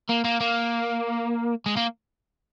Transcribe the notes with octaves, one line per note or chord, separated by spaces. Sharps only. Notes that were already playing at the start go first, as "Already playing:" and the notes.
A#3
A#3
A#3
G#3
A#3